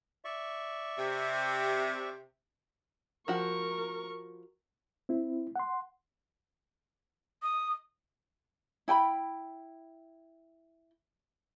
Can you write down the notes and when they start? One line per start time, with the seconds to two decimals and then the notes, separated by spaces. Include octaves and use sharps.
0.25 D5 E5 C#6
0.98 C3
3.28 F3 F#4 A#4 C#6
5.09 C4 E4
5.56 F#5 C6
7.42 D#6
8.88 E4 G5 G#5 B5